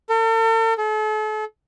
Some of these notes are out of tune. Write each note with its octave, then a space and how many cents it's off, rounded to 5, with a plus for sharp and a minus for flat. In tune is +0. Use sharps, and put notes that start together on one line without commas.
A4 +45
A4 -40